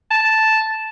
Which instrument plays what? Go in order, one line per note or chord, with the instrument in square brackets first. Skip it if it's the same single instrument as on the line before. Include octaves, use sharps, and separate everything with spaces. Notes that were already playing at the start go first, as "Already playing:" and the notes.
[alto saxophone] A5